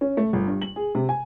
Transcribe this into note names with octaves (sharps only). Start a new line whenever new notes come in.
C#4
A3
G1
G2
F#7
G#4
C3
G#5